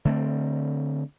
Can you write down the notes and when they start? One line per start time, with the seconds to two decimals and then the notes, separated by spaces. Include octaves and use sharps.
0.05 D3 A3 C4